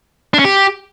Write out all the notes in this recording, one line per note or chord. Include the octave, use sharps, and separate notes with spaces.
D4
C#4
G4